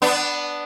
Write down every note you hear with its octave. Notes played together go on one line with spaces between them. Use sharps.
B3 D4